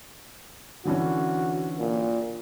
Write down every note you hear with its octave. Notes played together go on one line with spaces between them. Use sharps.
D3 E3 C#4 F#4
A#2